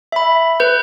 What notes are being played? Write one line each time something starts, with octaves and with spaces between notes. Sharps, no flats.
E5 B5
B4 G6